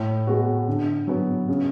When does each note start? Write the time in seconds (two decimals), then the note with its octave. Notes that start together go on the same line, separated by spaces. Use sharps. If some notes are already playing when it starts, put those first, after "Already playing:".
Already playing: A2
0.27 G#3 B3 F#4
0.68 D3
1.07 F#3 B3
1.48 C#3